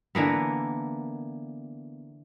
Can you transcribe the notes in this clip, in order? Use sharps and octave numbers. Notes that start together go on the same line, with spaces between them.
D3 E3 A#3 B3